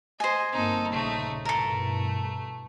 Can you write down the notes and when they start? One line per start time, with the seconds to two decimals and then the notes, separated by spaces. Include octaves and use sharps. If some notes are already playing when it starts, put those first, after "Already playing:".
0.20 C5 D#5 G#5
0.53 G1 A#3 C4 D#4 A4
0.92 A#1 C#3 A3 D#4
1.45 G2 B2 E3 A3 A4 A#4